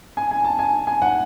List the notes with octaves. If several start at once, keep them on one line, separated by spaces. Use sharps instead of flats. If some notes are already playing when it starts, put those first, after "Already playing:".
G#5
G#5
A5
G#5
G#5
F#5